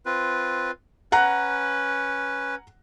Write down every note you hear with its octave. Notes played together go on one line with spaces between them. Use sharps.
C4 F4 B4
C#4 B4 F#5 A#5 F#6